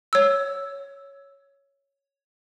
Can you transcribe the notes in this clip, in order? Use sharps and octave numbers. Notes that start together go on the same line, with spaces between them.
C#5 E6